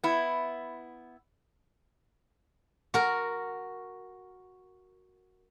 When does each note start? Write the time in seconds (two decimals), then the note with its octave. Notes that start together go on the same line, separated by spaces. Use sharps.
0.04 B3 E4
2.94 F#4 A#4